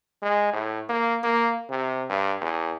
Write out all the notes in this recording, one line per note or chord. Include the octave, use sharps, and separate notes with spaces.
G#3
A2
A#3
A#3
C3
G2
E2